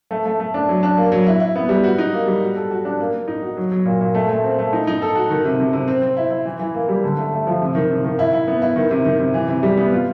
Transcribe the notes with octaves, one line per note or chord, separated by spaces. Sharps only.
A3
A3
A3
D4
F#3
D4
A#3
F#3
E4
E4
B3
G3
F#4
D#4
A#3
G3
F#4
A4
F#4
D4
A#3
A#3
D#4
F#4
F#3
F#3
A#2
A#2
A3
A3
C4
A3
D#4
D#4
A4
F#4
D#3
C3
C3
C3
C4
C4
E4
E4
E3
E3
A#3
G3
D3
A3
A3
F3
C3
D#3
C3
D#3
E4
E4
B3
E4
D#3
C3
D#3
C3
E3
C3
G3
B3
F4